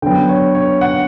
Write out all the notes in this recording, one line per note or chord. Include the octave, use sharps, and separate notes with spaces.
D3 F#3 B3 G5
C#5
C#5
F#5